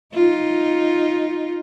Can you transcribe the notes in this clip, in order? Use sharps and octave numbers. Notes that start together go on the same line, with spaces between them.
D#4 F4